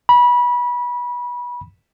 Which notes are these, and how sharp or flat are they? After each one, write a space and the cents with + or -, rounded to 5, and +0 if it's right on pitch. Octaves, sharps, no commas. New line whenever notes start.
B5 -25